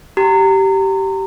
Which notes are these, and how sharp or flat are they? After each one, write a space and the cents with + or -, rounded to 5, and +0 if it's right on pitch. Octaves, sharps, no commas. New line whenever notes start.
G4 -20 A#5 -25